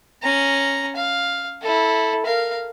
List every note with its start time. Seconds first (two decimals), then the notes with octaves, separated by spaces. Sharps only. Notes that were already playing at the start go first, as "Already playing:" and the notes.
0.23 C#4 A#5
0.97 F5
1.62 E4 A4
2.26 A#4 F5